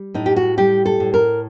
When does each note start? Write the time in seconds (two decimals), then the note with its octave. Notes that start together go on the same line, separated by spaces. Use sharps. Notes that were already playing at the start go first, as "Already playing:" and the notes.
Already playing: G3
0.14 A2 D#4
0.26 G4
0.36 F#4
0.57 G3 G4
0.86 A4
1.00 A2
1.14 A#4